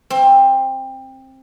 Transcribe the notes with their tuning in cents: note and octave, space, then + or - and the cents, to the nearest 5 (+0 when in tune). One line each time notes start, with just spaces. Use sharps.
C4 +20